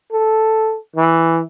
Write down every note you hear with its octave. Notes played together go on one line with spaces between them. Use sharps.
A4
E3